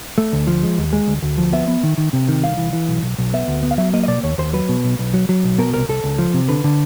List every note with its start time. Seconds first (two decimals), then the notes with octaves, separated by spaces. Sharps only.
0.18 A3
0.33 D2
0.47 F3
0.63 G#3
0.78 D#2
0.93 G#3
1.08 D2
1.22 D2
1.38 F3
1.53 B3 E5
1.68 B3
1.83 D#3
1.98 D#3
2.13 C3
2.29 D#3
2.43 C2 F5
2.57 E3
2.73 E3
2.89 B1
3.03 B1
3.18 B1
3.34 B3 E5
3.48 D2
3.63 B3
3.71 F5
3.78 F#3 E5
3.93 A#3 D#5
4.03 D#5
4.08 B2 D5
4.23 D#2 C#5
4.38 D#2 C5
4.53 F#3 B4
4.69 B2
4.84 B1
4.99 B1
5.14 F#3
5.29 F#3
5.44 B1
5.58 B2 A#4
5.73 C2 A#4
5.89 C2 A4
6.04 C#2
6.18 F3
6.34 C3
6.48 D3 B4
6.64 D3